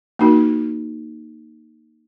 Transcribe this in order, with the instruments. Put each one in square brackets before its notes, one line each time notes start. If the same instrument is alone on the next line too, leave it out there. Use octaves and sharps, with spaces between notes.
[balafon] A#3 D#4 F#4 A#4